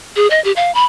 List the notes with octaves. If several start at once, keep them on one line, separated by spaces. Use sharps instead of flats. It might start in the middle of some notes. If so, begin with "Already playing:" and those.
G#4
D#5
G4
F5
B5